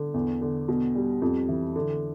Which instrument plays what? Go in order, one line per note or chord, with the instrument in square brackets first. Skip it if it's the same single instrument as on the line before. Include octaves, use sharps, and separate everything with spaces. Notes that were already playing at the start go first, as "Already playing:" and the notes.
Already playing: [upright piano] D3
E2
D3
B2
G3
F2
E3
D3